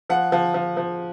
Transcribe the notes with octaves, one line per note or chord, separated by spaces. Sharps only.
F3 F#5
F3
F3
F3